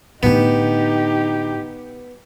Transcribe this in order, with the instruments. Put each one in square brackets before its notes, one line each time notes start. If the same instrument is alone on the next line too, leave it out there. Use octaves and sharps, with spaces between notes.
[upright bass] A2 D3 [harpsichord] B3 [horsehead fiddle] D#4 G4